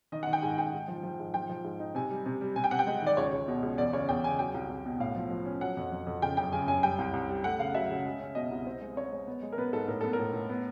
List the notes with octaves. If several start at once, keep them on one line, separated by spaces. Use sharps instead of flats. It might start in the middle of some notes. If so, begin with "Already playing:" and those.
D#3 D#5
D#3 F#5
G5
G#2 G#5
G#2 G5
G#2
F3
F3
G#2
F3 G5
F3
G#2
D#4
C3 G#5
G3
C3
G3
C3 G#5
G5
C3 F#5
G5
G#3
D#3 D5
C#2 C#5
C#2
B2
C#2
E2 D5
C#3 C#5
E2 G5
C#3 G#5
F#3 G5
C2
C2
B2
A2 F5
F3
F3
C#4
F#3 F#5
F2
F2
F2
C#3 G5
F#2 G5
C#3 G#5
F#2 G#5
G3 G5
C2
C2
G3
A3 F#5
C#3 F5
F#3 E5
C#3
G#3
C#4
B2 D#5
C2
C4
G#3
C4 C#5
G#3
B3
G#3
A#4
B3 B4
G#2 A4
A2 A#4
B3 A4
A#4
A2
A2
B3